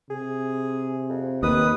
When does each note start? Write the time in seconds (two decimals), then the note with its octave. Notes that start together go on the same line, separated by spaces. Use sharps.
0.10 C3 G#4
1.09 F2
1.43 D#2 D#3 B4 D#6